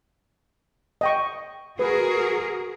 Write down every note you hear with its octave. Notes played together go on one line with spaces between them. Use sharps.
D#5 G5 C#6
F#4 G#4 A#4 B4